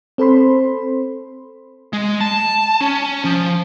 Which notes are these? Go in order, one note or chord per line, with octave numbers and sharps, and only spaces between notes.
C4 A4 C5 B5 C6
G#3
A5
C#4
F3